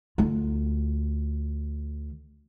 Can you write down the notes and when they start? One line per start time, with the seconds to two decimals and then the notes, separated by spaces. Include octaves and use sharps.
0.18 D2 F4